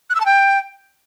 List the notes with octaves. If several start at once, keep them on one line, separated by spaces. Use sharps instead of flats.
F#6
E6
A5
G5